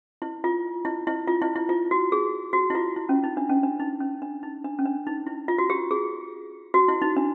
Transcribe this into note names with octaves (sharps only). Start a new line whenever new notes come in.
E4
F4
E4
E4
F4
E4
E4
F4
F#4
G#4
F#4
E4
F4
E4
C#4
D#4
D4
C#4
D4
D#4
C#4
D4
D#4
D4
C#4
D4
D#4
E4
F4
F#4
G4
G#4
F#4
E4
D#4
D4